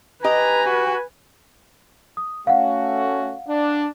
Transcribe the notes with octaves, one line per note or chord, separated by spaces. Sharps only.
G4 B4 D#5 G#5 A#5
F#4
D#6
A3 C#4 F#4 F5 F#5
D4